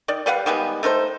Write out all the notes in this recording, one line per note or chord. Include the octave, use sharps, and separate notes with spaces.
D#3 D5
G3 B4 F5 F#5
D#3 G3 G#3 B3
A3 D#4 A#4 C5